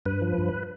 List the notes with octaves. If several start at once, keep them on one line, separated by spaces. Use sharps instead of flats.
G2 B4
F3
G2